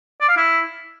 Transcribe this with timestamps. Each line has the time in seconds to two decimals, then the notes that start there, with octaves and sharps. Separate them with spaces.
0.21 D5
0.29 F5
0.37 E4